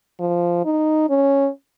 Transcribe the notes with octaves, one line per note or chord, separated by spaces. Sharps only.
F3
D#4
C#4